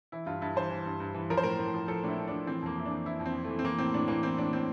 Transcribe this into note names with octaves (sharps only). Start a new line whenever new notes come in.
E3 E4
G2 F4
G2 E4
E3 C5
E3
G2
G2
E3
F3 A#4
C5
A2 A#4
A2
F3
F3 A4
A2 D4 E4
A2
F3 D4
E3 C4
F2 A#3
F2 E4
D4
E3
E3 E4
F2
C4
F2
A3
E3
C4
E3 A#3
A2 C4
A2 D4
E3 A#3
E3 C4
A2 D4
A2 C4